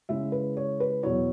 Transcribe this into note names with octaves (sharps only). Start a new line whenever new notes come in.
C#3 G#3 E4 E5
B4
C#5
B4
E2 B2 F#3 B3 E4 C#5